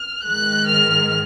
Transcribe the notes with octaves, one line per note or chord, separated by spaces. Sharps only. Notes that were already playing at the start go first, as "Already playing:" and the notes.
Already playing: F6
G#2 D#3 G#3 F#6
F6